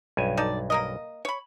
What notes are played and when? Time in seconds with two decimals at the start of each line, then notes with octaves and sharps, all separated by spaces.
0.17 B1 G2 G#5
0.37 D#4 A4 D5
0.70 A#3 A#4 D#5
1.25 C#5 B5